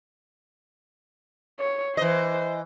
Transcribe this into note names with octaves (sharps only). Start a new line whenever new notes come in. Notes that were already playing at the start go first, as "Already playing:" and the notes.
C#5
E3 C5 D#5